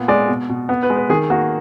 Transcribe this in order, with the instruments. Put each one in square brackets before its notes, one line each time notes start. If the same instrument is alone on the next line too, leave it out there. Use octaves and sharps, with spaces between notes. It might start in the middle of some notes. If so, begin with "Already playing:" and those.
Already playing: [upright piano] A#2 B3
G#3 D5
B2
B2
B3
B4
G#3
B4
D#3 G#4
A#3 F#4